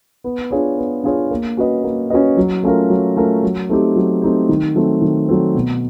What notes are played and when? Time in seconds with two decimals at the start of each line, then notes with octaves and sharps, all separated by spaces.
0.24 B3
0.51 D4 F4 G#4 C#5
0.78 B3
1.04 D4 F4 G#4 C#5
1.31 A#3
1.57 C#4 F#4 B4 D#5
1.84 A#3
2.10 C#4 F#4 B4 D#5
2.37 F#3
2.63 A3 C#4 F4 A#4
2.90 F#3
3.17 A3 C#4 F4 A#4
3.43 F#3
3.69 A3 C4 D#4 G4
3.96 F#3
4.22 A3 C4 D#4 G4
4.49 D#3
4.75 F#3 A3 C4
5.02 D#3
5.29 F#3 A3 C4
5.55 B2